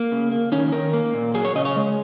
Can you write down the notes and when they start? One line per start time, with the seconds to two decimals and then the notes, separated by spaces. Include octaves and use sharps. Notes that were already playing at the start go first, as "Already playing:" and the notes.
Already playing: A#3
0.12 C#3
0.32 A#3
0.52 D#3 C#4
0.72 D#3 A#4
0.93 A#3
1.14 A#2
1.34 F#3 G#4
1.45 C#5
1.56 C#3 D#5
1.65 C#5
1.76 G#3